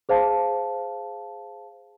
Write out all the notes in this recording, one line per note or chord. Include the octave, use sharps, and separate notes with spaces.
G#4 C5 F5 A5